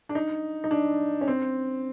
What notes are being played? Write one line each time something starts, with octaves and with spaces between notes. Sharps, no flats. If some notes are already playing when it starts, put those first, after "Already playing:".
D4
D#4
D#4
D4
C#4
C4